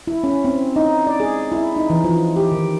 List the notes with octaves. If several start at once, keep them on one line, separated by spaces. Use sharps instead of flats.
E4
C#4
C4
D#4
D5
G#4
E4
D#4
E3
F3
G4
D#3